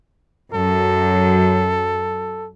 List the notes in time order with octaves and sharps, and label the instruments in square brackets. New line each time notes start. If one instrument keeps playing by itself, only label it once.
[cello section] F#2 [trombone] A4